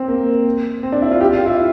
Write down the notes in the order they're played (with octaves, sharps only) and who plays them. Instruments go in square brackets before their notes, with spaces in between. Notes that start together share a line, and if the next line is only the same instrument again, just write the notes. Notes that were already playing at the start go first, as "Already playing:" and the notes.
Already playing: [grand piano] C4
A#3
C4
D4
E4
F4
G4
F4
E4